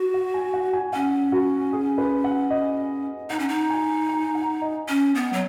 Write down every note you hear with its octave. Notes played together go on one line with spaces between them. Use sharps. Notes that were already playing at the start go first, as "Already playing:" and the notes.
Already playing: F#4
F#5
G#5
F#5
G#5
C#4 F#5
F#4
G#4
B4
F#5
D#5
D#4 F#5
C#4
D#4
G#5
G#5
F#5
D#5
C#4
B3
F#3